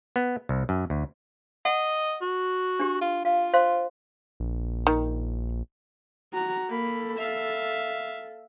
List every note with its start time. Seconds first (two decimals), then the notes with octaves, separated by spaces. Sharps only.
0.16 B3
0.49 C2
0.69 F#2
0.90 D2
1.65 D#5 F#5
2.21 F#4
2.80 D4 G4
3.01 F4
3.25 F4 F5
3.54 C5 F5 C6
4.40 A#1
4.87 D#3
6.33 F#4 A#5
6.69 A#3 A4 B5
7.18 E5 F5